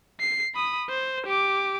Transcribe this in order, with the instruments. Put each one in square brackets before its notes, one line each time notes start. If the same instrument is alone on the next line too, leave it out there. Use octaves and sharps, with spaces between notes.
[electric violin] C7
B5 D#6
C5
G4 D6